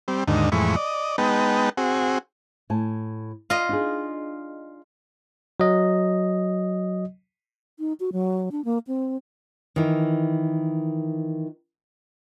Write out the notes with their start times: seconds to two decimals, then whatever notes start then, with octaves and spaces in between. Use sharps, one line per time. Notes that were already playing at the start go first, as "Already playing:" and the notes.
0.08 G3 C4
0.28 D#2 G#2 D3 D#4
0.52 F2 A2 E3 G#3 B5 C#6
0.76 D5 D#5
1.18 G#3 B3 D#4 B4 G5 A5
1.77 C4 F#4 G#4
2.70 A2 G#5 A5
3.50 F4 D#5
3.69 D4 D#4 G#4
5.60 F#3 D#5
7.78 D#4
8.00 F#4
8.13 F#3
8.52 D4
8.65 A#3
8.87 C4
9.76 D#3 E3